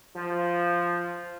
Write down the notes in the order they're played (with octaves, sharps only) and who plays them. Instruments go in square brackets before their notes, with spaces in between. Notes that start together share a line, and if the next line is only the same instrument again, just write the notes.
[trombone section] F3